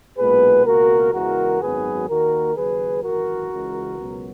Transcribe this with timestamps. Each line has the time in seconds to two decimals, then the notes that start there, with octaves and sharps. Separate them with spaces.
0.18 B1 A#2 G#3 B3 G#4 B4
0.65 C#2 B2 A#3 F#4 A#4
1.13 E2 C#3 E3 G#3 F#4 A#4
1.60 G#1 F#2 D#3 F#3 B3 G#4 B4
2.08 D#2 D#3 A#3 F#4 A#4
2.55 D#2 C#3 F#3 G#4 B4
3.03 G#1 F#2 E3 F#4 A#4
3.50 C#2 C#3 E3 G#3
3.98 C#2 B2 F#3 B3